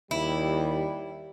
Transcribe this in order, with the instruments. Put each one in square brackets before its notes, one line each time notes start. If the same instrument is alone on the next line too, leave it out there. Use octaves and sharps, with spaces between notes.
[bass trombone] D#2 [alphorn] G3 [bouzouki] E4